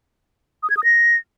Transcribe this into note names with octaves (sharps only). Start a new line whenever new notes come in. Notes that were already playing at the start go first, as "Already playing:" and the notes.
D#6
G#6
D#6
A#6